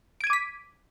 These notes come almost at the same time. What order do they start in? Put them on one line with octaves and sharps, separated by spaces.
D7 G#6 D#7 D6 B6